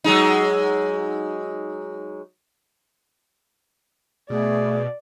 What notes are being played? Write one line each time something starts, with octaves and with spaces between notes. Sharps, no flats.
F#3 G#3 D#4
B2 A3 G#4 D5